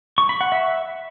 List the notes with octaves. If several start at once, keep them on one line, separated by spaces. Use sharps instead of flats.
C#6
B5
F#5
E5